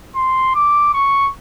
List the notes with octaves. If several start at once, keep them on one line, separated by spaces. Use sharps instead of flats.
C6
D6
C#6